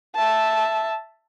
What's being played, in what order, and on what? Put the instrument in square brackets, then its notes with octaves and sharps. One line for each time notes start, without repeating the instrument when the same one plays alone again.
[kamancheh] E5 A5